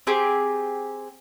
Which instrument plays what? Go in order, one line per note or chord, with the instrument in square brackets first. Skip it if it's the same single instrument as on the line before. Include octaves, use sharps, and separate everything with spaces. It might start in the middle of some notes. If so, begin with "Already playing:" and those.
[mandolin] C4 G4 G#4 D6